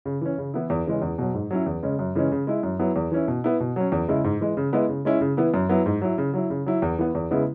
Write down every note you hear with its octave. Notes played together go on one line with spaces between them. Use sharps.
C#3
E3 C#4
C#3
E3 B3 E4
E2
C#3 E3 G#3 C#4
E2
B2 F#3
G#2
F#3 C#4 E4
E2
C#3 G#3 C#4
F#2
C#3 E3 G#3 C#4
C#3
G#3 E4
F#2
F#3 B3 E4
E2
E3 C#4 E4
B2
B3 E4
B2
F#3 C#4
E2
C#3 G#3 E4
G#2
E3 G#3
C#3
G#3 B3 E4
C#3
G#3 C#4 E4
C#3
E3 B3 E4
F#2
F#3 B3 E4
G#2
F#3 E4
C#3
F#3 E4
C#3
F#3 E4
E2
E3 B3
E2
C#3 G#3 B3 E4